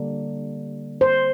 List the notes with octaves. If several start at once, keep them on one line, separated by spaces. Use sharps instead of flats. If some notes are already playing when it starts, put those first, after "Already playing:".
Already playing: D3 G3 A#3
C5